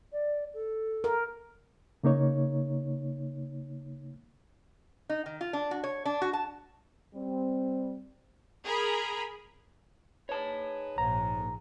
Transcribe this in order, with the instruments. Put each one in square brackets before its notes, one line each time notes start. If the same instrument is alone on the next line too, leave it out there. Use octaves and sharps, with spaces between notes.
[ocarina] D5
A4
[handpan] A#4
[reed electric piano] C#3 A#3 D#4 C#5
[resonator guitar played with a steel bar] D#4
D#3
F4
D4
F#4
C#5
D4
F#4
A5
[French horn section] G3 C4
[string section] G#4 A#4 B5
[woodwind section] D#4 G#4 B4 [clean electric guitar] C#5 A5
[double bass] A#1 [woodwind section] G#2 [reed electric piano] A#5